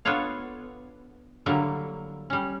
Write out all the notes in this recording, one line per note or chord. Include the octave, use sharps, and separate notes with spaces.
B3 D4 F4 A4 C#5 F5
D3 F#3 G3 A#3 E4
G3 C#4